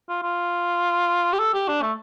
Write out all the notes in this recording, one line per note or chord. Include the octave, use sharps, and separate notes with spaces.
F4
F4
G4
A4
G4
D4
A3